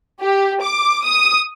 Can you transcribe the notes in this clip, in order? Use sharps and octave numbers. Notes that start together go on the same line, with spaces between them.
G4
D6
D#6